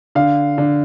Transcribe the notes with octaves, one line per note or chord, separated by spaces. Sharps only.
D3 F5
D3